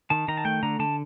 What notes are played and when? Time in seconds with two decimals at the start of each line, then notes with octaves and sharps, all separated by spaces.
0.10 D#3 A5
0.28 D#3 A#5
0.37 A5
0.45 A3 G5
0.63 D3 A#5
0.79 D3 A5